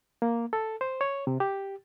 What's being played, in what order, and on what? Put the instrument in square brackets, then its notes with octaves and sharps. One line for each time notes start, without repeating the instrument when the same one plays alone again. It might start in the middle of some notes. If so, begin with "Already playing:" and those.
[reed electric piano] A#3
A4
C5
C#5
C3
G4